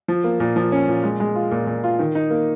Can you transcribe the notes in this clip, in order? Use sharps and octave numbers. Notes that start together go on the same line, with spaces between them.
F3
A#3
A#2
F3
C#4
A#2
G#3
G#3
F4
A#2
A#2
F4
D#3
D#4
A#3